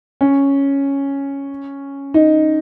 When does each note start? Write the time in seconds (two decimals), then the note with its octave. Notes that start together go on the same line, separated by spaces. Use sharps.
0.21 C#4
2.14 D#4